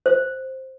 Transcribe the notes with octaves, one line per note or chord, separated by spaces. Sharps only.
C5